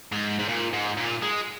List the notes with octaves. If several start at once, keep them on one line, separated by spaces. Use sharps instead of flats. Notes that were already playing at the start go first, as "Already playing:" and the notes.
G#2
G#2
A#2
G#2
A#2
G#3